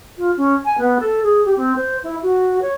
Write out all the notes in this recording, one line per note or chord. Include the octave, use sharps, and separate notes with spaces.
F4
C#4
G#5
B3
A4
G#4
G4
C4
C5
E4
F#4
C#5